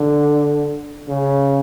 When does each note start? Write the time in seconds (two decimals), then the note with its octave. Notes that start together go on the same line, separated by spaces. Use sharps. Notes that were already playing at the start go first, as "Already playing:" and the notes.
Already playing: D3
1.08 C#3